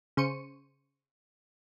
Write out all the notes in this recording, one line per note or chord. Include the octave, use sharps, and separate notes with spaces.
C#3 C5 C#6 C#7 D#7